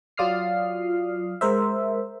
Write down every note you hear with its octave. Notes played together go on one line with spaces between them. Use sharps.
F#3 F4 D5 D#6 F6 C7
G#3 A#4 C5 E5